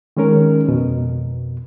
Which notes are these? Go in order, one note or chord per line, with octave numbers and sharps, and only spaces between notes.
D#3 G#3 C#4 A#4
F2 B2